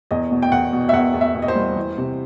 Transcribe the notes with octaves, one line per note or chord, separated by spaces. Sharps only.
E2 D#5
B2
G5
E2 F#5
B2
E5
E2 F#5
E2
E5
B2
D#5
C5
G3
E3
C3